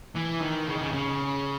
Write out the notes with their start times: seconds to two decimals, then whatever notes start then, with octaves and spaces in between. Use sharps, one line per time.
0.16 E3
0.41 D#3
0.67 C#3
0.75 D#3
0.81 C#3
0.92 C#3